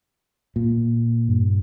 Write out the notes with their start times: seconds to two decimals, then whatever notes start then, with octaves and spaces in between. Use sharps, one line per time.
0.56 A#2
1.29 G2